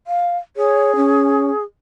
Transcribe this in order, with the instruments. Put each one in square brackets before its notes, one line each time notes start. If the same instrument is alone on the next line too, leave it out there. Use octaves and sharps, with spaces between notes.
[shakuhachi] F5
[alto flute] G#4 [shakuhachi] C#5
[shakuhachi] C#4